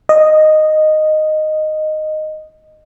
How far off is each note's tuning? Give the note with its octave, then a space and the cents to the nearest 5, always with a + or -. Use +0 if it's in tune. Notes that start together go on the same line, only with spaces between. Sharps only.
D#5 -5